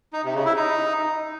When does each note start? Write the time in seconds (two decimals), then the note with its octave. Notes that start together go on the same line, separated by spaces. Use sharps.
0.13 D#4
0.24 C3
0.35 C#3
0.46 E4
0.56 D#4